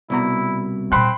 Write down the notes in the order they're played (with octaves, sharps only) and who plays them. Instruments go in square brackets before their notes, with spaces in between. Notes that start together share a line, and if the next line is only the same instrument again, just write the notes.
[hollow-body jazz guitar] C2 B2 A#5 [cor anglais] E4
[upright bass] A#2 G3 [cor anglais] C4 [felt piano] B5 C6 F#6